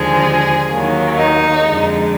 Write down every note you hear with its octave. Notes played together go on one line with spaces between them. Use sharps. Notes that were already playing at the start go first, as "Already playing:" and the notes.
Already playing: D#2 D3 F3 G#3 G#4
D#2 D#3 F#3 A#3
D#4
F2 D3 G#3